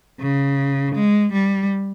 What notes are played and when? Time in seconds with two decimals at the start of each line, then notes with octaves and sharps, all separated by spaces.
0.20 C#3
0.95 G#3
1.32 G3